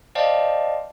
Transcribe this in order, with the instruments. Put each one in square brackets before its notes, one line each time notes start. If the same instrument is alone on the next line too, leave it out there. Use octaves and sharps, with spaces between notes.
[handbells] C5 D5 D#5 F5 G5 A5